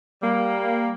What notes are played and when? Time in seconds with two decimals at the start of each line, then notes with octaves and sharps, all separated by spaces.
0.22 G3 A#3